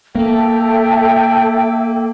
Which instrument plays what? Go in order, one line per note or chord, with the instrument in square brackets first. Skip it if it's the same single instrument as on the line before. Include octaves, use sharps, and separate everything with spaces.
[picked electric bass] A#3 [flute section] A4 E5 G5